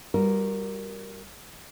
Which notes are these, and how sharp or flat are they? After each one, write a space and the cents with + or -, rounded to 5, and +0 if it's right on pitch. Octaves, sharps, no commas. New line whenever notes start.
G3 +0 F#4 -35 A#4 +0